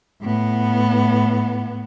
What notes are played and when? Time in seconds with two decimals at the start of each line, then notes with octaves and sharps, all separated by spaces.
0.22 A2 B3